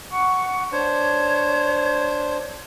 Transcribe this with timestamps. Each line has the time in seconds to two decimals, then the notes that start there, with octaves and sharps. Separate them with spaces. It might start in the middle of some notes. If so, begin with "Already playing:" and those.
0.11 F#5 C#6 D6
0.72 D4 C5 C#5